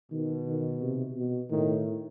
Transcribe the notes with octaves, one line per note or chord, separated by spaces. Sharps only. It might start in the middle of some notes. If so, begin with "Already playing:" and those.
B2 D#3
D#3
C3
B2
A2 D#3